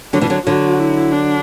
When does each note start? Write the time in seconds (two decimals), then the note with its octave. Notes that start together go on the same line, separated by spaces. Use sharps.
0.13 D3 F#3 D4
0.21 B2 E3
0.30 D3 F#3
0.47 D3 F#3 F#4
0.80 E4
1.12 D4